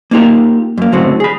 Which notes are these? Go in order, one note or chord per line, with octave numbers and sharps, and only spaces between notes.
A#3 B3 D#4 F4 G4 A#4
F#2 A#3
C#2 F#2 A2 D3 C4 F#4
G#4 B5